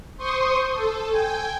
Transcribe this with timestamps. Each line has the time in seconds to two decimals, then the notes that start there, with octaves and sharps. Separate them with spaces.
0.17 C5 C6 C#6 D#6
0.73 A4
1.09 G5 G#5